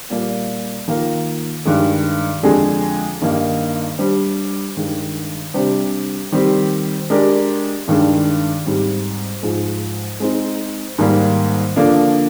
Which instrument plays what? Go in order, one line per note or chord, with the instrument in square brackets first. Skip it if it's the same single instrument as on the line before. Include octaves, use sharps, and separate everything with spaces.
[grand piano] A#2 G3 A#3
D#3 A#3 F4 A#4
G2 D#3 G#3
F2 D3 G#3 D4 G#4
G2 D#3 A#3 D#4
G3 D4 G4 C5
G2 D#3 G#3
C3 G3 D4 G4 C5
D#3 G3 C4 G4
G#3 D4 G4 A#4 D5
G2 D#3 G#3 D4
G#2 G3 C4 G4
G#2 F3 G#3
G#3 C4 D#4
G#2 D#3 G3 A#3
D3 F3 A#3 D4